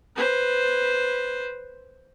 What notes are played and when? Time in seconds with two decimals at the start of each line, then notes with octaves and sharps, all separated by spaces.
0.16 B4 C5